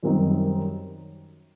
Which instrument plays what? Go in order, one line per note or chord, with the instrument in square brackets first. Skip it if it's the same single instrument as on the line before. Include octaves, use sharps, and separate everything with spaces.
[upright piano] F#2 D#3 G3 C4 D#4